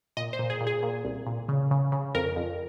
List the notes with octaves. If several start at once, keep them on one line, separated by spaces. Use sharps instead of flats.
A#2 D#5
C5
A#2
G#4
A#2
G#4
A#2
C2
A#2
C#3
C#3
C#3
F2 A#4
F2